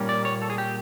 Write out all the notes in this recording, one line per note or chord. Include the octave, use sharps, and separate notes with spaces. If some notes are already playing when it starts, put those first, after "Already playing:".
Already playing: A#2 G3 A#3 C#4
D5
C#5
A4
G#4
G4